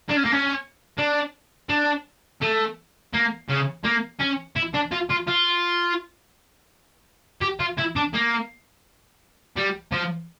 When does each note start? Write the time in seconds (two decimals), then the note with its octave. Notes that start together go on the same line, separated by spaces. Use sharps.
0.09 D4
0.16 C#4
0.24 A#3
0.32 C#4
0.98 D4
1.69 D4
2.42 A3
3.13 A#3
3.48 C#3
3.84 A#3
4.19 C#4
4.56 E4
4.74 D4
4.92 F4
5.10 F4
5.28 F4
7.41 G4
7.59 F4
7.78 E4
7.96 D4
8.14 A#3
9.57 G3
9.92 F3